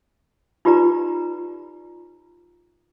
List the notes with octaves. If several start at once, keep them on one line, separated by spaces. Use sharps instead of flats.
D#4 F4 G4 B4 D5 A#5